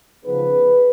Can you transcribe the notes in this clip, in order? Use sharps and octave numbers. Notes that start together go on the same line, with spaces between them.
C#3 F3 B3 D#4 G#4 B4